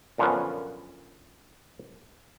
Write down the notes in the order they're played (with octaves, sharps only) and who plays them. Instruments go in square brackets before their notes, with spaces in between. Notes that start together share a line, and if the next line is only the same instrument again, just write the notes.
[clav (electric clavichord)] F#2 A#2 D3 F3 B3 C#4